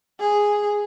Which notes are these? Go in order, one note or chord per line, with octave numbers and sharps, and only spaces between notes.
G#4